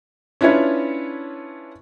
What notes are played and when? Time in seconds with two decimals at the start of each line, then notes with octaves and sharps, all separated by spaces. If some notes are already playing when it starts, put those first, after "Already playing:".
0.41 C#4 D4 E4 F4 B4 C#5